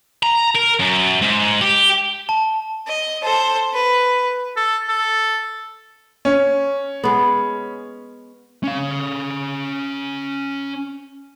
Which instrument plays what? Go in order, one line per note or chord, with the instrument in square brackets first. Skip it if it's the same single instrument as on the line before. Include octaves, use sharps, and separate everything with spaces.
[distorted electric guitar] A#5
A#4
F#2
G#2
G4
[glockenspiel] A5
[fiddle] D#5
A4 C5
B4
[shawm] A4
A4
[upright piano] C#4
[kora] G#3 B3
[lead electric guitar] C#4 F5